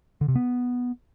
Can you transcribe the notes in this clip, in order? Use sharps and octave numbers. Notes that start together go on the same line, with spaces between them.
D3
C3
B3